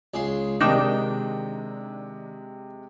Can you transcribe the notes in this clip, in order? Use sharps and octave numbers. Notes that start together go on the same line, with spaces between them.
C#2 G#4 C6
C3 D#3 G#3 D4 D#4 G5